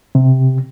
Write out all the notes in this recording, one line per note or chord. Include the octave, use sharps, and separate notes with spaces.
C3